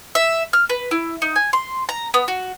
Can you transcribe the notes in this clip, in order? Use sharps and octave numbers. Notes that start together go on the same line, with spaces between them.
E5
F6
B4
E4
D#4
G#5
C6
A#5
B3
F#4